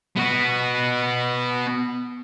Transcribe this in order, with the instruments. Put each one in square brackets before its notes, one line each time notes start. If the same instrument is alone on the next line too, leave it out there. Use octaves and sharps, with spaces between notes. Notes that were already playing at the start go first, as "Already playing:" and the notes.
[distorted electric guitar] B3 F#4